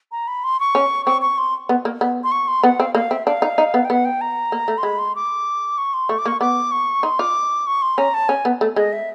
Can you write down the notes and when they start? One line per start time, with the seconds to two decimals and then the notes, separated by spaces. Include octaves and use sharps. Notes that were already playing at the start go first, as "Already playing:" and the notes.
0.12 A#5
0.28 B5
0.44 C6
0.60 C#6
0.75 C#4
1.06 C4 C#6
1.22 C#6
1.38 C6
1.69 B3
1.85 A#3
2.01 B3
2.24 C6
2.32 C#6
2.48 C6
2.63 B3 F#5
2.80 C4 F5
2.95 A#3 F5
3.11 C4 E5
3.26 D4 F5
3.42 D#4
3.58 D#4
3.74 B3
3.84 G5
3.90 B3 F#5
4.05 G5
4.21 A#5
4.52 A#3
4.68 A3
4.78 C6
4.83 G#3 B5
4.99 C6
5.15 D6
5.78 C#6
5.94 C6
6.09 A3 C#6
6.19 D6
6.26 A#3 C#6
6.40 B3 D6
6.72 C#6
7.03 D#4 C6
7.19 F4 D6
7.67 C#6
7.82 C6
7.98 C#4 A#5
8.14 A5
8.29 C#4 G#5
8.45 B3
8.61 A3
8.76 G#3 D#5
8.93 E5